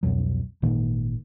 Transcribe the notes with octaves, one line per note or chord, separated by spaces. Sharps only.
C2 F2 B2 F#3
G#1 A#2 D#3 A#3